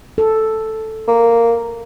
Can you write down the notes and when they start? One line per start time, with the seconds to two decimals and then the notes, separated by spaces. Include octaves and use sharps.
0.18 A4
1.08 A#3